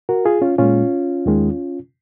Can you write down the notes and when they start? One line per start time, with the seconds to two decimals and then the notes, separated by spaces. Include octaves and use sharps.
0.09 F#4 A#4
0.25 F4 G#4
0.42 C#4 F4
0.58 A#2 G#3 C#4 F4
1.26 D#2 D#3 G#3